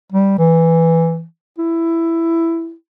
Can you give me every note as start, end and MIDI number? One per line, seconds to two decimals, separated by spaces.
0.13 0.36 55
0.39 1.24 52
1.59 2.74 64